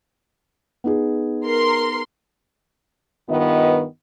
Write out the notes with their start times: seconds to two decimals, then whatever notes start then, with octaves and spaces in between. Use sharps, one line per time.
0.84 B3 D#4 G#4
1.45 A#4 C6
3.29 G2 D#3 B3 F4 B4 D#5